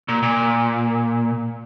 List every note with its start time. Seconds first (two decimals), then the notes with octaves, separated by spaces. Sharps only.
0.08 A#2
0.23 A#2